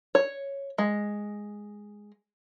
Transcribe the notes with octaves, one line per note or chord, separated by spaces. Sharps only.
C#5
G#3